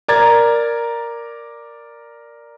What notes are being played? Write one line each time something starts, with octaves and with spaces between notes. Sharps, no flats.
A#4 D5 A#5 G#6 A6